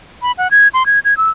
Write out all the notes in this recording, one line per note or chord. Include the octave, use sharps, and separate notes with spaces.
B5
F#5
G#6
C6
G#6
G#6
E6